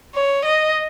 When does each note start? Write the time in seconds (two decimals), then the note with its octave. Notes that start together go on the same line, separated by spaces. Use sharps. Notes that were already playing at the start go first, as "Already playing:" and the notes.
0.15 C#5
0.45 D#5